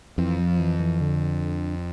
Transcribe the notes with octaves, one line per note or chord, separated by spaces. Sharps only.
F2 E3
F3
E3
E3
D3